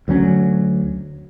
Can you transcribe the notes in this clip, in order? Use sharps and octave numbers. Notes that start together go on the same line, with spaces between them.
D2 F#3 G3 C#4